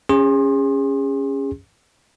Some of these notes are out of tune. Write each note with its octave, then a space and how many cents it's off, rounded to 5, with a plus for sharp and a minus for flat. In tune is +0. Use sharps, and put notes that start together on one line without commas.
C#4 +0 G#4 -30 C6 +30